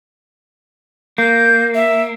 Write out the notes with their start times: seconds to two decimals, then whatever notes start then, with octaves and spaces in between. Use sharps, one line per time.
1.18 A#3 G6
1.75 E5